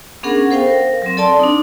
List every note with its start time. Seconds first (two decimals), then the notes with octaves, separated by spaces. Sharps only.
0.23 B3 C#4 D4 G#4 A#4 F#5
0.51 A4 C5 F5 G5
0.67 A#4
1.02 F#3 C4
1.17 A4 D5 A5 C6
1.39 D4 D#4